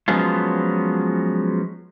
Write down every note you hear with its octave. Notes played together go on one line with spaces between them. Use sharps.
F3 F#3 G#3 B3 C#4 F4